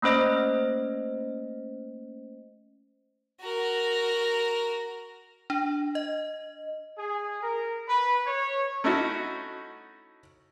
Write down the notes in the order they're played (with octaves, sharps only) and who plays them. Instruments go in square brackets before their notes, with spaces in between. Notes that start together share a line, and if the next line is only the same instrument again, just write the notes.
[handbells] A3 A#3 C#4 C5 D#5 A#6
[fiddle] F#4 A#4
[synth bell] D4
D#5
[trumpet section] G#4
A#4
B4
C#5
[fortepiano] A3 C#4 D#4 E4 F#4